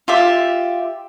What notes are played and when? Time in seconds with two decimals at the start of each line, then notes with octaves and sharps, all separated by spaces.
0.08 F4 G4 E5